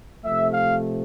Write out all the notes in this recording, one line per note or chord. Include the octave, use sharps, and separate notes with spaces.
C3 F3 A3 E5
F5